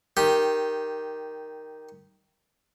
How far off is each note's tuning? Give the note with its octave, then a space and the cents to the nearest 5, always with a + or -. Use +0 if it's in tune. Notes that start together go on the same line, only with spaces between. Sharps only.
D#3 +0 G4 +0